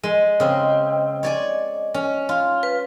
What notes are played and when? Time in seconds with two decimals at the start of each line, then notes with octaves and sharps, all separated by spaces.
0.04 G#3 D#5
0.40 C#3 C4
1.23 C#5 D5 G#5
1.94 C#4
2.29 F4
2.63 B4